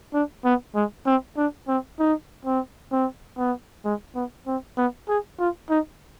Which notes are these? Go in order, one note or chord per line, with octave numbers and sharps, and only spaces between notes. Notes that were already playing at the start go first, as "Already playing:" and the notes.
D4
B3
G#3
C4
D4
C4
D#4
C4
C4
B3
G#3
B3
C4
B3
G#4
F4
D#4